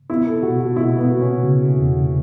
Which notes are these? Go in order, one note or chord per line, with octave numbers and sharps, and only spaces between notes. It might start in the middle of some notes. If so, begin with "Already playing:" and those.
B3 E4
A4
B2 F#4
F#4
B2 E4
B3
F#4
C#4
C#3
E2